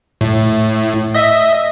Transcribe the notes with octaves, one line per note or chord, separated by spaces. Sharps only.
A2
D#5 E5